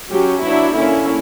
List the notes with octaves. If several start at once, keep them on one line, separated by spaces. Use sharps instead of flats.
F#3 C#4 G4
F#3 B3 D4 E4
D3 A#3 C#4 E4